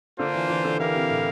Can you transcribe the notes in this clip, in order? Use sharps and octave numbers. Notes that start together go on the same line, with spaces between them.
D3 A#3 D4 F4 C5
E3
E3
D3
E3 E4 G4 A#4 F5
C3
A2